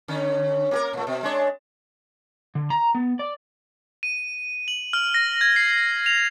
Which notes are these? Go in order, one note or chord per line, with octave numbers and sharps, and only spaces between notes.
D3 C#4
A#3 G4 A#4
A#2 A3
B2
G#3 D4 C#5
D3
A#5
B3
D5
D#7
F#7
F6
A#6
G#6
C7
F7